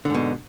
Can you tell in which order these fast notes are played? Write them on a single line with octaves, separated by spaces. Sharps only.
D3 G#2 B2